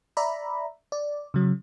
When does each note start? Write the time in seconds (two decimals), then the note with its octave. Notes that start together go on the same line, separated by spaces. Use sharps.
0.17 D5 E5 A#5 B5
0.92 D5
1.34 C#3 F#3